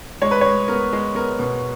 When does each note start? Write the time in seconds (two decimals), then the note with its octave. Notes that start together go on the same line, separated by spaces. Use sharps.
0.22 G#3 C#5
0.31 B4
0.41 G#3 C#5
0.68 B3 A#4
0.93 G#3
1.15 B3 A#4
1.39 B2